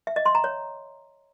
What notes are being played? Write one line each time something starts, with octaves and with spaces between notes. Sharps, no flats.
E5
D#5
C6
A#5
C#5